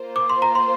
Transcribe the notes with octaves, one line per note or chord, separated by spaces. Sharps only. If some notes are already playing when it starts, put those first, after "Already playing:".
Already playing: A#3 F4 C5
D6
C6
A#5
C6